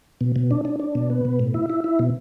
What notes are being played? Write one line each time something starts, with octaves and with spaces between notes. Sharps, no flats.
B2
B2
D4
D4
D4
B2
B3
B2
A2
E4
E4
E4
B2